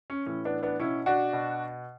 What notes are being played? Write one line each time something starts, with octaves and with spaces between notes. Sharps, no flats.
C#4
A2 E3 C#4
B3 D4
B3 D4
B2 C#4 E4
D4 F#4
B2